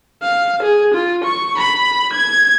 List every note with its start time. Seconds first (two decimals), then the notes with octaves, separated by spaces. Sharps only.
0.23 F5
0.63 G#4
0.94 F4
1.24 C#6
1.58 B5
2.13 G#6